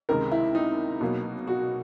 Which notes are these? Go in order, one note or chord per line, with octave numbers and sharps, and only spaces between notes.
C#2 C3 D#3 G#3 A#4
E4
D#4
B2 F#3 A#3
F#4